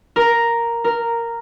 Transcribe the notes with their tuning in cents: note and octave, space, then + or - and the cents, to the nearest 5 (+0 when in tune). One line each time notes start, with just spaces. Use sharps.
A#4 +0
A#4 -5